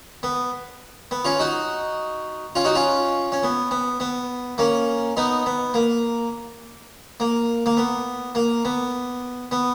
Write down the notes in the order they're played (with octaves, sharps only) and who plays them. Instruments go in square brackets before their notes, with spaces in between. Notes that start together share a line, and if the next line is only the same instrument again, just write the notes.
[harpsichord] B3
B3
C#4 F4
D#4 F#4
C#4 F4
D#4 F#4
C#4 F4
C#4
B3
B3
B3
A#3 C#4
B3 D#4
B3
A#3
A#3
A#3
B3
A#3
B3
B3